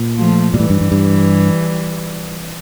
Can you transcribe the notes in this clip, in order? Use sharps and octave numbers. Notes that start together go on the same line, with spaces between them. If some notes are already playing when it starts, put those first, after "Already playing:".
Already playing: A#2
F3 A3
A#2
A2 E3 G3
G2
G2
G2